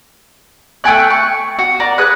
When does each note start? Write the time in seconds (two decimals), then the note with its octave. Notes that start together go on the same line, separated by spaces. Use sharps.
0.84 A3 G5 G#5 F#6
1.10 C#6
1.59 F#4
1.80 A#4 D5
1.98 G#4 B4 F#6